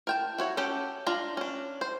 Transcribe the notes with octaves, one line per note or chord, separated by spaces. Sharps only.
A#4 G5 A5
E4 F#4 C#5
C#4 G4 A4 F#5 G5
D4 F4 A#5
C#4 D4
C5